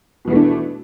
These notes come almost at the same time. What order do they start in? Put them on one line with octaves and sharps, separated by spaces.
B2 E3 B3 A3 D4